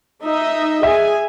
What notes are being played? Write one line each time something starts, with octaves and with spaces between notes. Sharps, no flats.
D#4 D#5 E5
G#4 E5 G#5